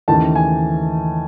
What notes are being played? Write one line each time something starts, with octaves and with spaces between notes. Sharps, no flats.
D#2 C#3 E3 A3 D#4 A5
G#5